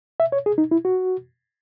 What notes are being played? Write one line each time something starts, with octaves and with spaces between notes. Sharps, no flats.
E5
C#5
G#4
D#4
E4
F#4